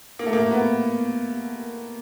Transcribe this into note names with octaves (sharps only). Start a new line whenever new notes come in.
A#3
A3
A#3
B3